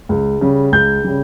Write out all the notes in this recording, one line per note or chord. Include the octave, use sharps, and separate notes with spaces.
C#2
C#3 G3
C#2 G6
C#3 G3